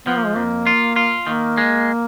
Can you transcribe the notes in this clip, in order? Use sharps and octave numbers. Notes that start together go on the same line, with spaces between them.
F3 B3
A#3
G#3
F2 A#3
F4
F4
D#3 A#3
G#3